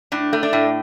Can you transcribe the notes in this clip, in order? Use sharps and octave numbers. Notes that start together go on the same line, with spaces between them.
A2 D4
A3
D4
A2